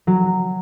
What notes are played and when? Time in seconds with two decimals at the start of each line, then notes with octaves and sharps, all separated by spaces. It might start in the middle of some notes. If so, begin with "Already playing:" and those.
0.07 F#3